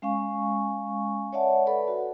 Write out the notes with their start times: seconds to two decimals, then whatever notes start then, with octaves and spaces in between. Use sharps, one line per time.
0.02 G#3 C#4 F5 G#5 C#6
1.33 C#5 D5 E5 F#5 A5
1.67 A4 B4 D5 F#5 B5
1.88 F#4